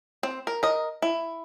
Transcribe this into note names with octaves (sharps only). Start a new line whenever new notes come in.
C4
A#4
A#4 D#5
E4